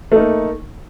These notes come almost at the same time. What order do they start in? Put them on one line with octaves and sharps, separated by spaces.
A3 D#4 A#3